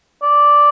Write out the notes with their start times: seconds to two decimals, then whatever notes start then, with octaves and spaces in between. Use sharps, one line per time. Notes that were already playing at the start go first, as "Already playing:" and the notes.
0.23 D5